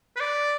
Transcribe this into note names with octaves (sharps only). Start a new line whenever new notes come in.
B4
D5